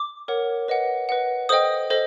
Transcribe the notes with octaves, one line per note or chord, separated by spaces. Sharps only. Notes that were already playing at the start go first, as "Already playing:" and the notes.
Already playing: D6
A#4 C#5 F#5
B4 D#5 F#5
B4 D#5 F#5
A4 C5 D#5 G5 D#6
A4 C5 D#5